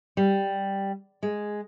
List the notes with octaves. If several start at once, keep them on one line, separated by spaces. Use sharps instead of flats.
G3
G#3